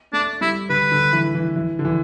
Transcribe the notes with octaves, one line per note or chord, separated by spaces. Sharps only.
A3 D4
G3 E4
D3 B4
D3
E3
E3
E3
D3
E3